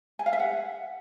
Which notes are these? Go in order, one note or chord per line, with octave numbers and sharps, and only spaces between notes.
G#5
F5
E5
F#5